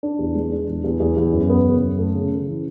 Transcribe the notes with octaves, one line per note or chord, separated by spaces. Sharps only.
D4
E2
G#3
D4
E2
E2
E2
E2
F#2
B3
C#3
F#2
A3
C#3
C#3
E3